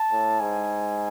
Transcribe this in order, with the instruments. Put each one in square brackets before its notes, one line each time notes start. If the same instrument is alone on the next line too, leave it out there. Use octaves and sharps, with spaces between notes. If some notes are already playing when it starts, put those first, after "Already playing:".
Already playing: [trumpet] A5
[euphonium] A2
[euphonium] G#2 [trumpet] G#5